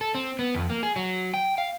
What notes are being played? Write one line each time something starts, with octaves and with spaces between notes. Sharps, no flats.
A4
C4
B3
F2
A#3
G#4
F#3
G5
F5